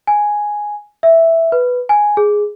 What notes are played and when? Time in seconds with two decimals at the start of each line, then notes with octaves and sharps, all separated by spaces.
0.07 G#5
1.03 E5
1.52 B4
1.89 G#5
2.17 G#4